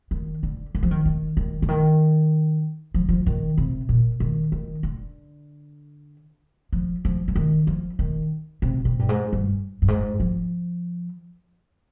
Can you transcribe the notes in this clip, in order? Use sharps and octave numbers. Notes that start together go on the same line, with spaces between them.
D#3
D3
D#3
F3
D#3
D#3
D#3
D3
D#3
F3
F3
D#3
C3
A#2
D#3
D#3
D3
F3
F3
F3
D#3
F3
D#3
C3
C3
G2
G#2
G2
G2
G#2
F3